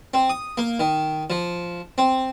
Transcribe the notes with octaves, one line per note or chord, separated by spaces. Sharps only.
C4
D#6
A#3
D#3
F3
C4